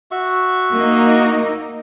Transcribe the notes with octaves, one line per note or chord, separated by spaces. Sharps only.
F#4 E5 C#6
A#3 D#4